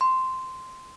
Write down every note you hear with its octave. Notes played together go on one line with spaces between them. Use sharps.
C6